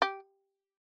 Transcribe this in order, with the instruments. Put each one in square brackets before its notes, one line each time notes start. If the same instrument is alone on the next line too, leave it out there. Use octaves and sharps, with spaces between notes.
[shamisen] G4